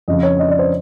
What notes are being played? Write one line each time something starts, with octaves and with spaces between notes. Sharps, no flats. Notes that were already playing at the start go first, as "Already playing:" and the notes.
F2 C#3 F3 D#5
C#5
D#5
D5
C5